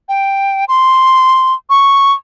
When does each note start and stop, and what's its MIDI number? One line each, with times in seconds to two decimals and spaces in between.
0.09 0.65 79
0.68 1.53 84
1.70 2.13 85